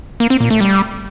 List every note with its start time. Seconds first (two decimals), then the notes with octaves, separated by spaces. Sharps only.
0.20 A#3
0.30 C4
0.40 A#2
0.50 A3
0.61 G3